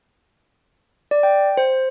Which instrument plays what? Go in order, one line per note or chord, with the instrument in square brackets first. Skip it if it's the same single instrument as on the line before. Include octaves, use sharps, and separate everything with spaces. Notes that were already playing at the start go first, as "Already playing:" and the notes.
[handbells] D5
G5
C5